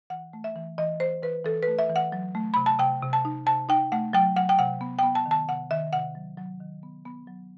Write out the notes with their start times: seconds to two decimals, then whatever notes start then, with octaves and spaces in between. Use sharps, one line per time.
0.10 E3 F#5
0.33 A3
0.44 E5
0.56 E3
0.78 E3 D#5
1.00 E3 C5
1.22 E3 B4
1.45 E3 A4
1.63 A3 B4
1.79 E5
1.90 E3
1.96 F#5
2.12 F#3
2.35 A3
2.54 C3 B5
2.66 A5
2.79 C3 G5
3.02 C3
3.13 A5
3.25 D#4
3.47 C3 A5
3.69 D#4 G5
3.92 A3 F#5
4.13 F#3 G5
4.36 F#3 F#5
4.49 G5
4.59 C3 F#5
4.81 B3
4.99 B3 G5
5.15 A5
5.26 D#3
5.31 A5
5.49 C3 F#5
5.71 D#3 E5
5.93 C3 F#5
6.15 F#3
6.37 F#3
6.60 D#3
6.83 B3
7.06 B3
7.27 F#3